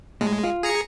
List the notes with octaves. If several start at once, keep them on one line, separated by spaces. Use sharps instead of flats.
A2 G#3
F4
G#4 A#5 C#7